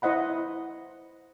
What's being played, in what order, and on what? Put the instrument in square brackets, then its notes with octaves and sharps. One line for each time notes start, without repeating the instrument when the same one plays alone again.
[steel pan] E4 C5 D#5 F#5 B5